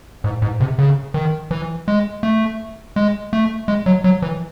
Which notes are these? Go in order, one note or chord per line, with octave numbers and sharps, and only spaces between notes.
G#2
G#2
C3
C#3
D#3
E3
G#3
A3
G#3
A3
G#3
F#3
F#3
E3